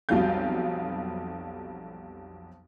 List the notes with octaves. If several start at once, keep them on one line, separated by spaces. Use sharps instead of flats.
B1 F2 F#3 G3 F5 G6